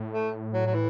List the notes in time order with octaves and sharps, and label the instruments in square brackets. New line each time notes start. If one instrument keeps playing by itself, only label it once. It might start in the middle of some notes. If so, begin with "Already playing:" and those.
Already playing: [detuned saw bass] A2
[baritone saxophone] A3
F#3
F#3
E3